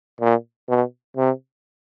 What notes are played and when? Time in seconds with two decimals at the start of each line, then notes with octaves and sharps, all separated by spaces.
0.21 A#2
0.68 B2
1.17 C3